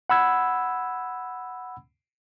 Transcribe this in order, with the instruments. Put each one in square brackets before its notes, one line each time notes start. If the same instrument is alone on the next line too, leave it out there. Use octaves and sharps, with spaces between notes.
[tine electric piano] F#5 B5 E6 G#6